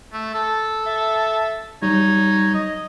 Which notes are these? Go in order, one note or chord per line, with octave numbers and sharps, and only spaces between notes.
A3
A4
E5
F#3 G3 D#4 C#5
D#5